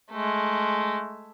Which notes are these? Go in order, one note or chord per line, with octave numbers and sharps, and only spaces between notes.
G#3 A3